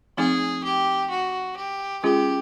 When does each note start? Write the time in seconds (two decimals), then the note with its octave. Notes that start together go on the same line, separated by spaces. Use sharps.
0.17 F3 A3 C4 D#4 G#4
0.64 G4
1.10 F#4
1.57 G4
2.04 G#3 C#4 F4 G4 G#4